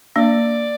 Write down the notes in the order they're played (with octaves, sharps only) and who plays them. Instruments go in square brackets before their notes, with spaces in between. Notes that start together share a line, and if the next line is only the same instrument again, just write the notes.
[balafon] A#3 D4 [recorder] D5